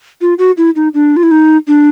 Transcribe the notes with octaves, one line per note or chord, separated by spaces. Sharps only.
F4
F#4
E4
D#4
D4
F4
E4
D#4
D4